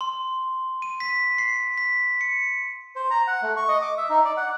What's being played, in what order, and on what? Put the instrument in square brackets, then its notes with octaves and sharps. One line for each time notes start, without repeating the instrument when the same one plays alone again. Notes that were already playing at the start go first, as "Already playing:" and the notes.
[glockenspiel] C6
D#7
B6
C7
B6
C#7
[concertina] C5
A#5
F#5
A3
C#6
D#5
D6
E5
D#4
D5
F#5